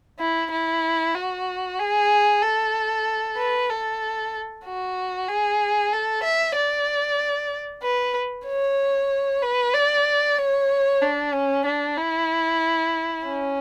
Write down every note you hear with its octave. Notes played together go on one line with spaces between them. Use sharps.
E4
E4
F#4
G#4
A4
B4
A4
F#4
G#4
A4
E5
D5
B4
C#5
B4
D5
C#5
D4
C#4
D4
E4
C#4